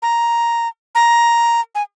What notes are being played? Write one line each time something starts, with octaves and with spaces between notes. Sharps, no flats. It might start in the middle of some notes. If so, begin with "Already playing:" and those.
A#5
A#5
G#5